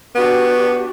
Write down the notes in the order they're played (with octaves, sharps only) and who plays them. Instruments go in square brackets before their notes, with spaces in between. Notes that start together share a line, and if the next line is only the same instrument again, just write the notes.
[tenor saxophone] B3 [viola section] D4 F#4 G4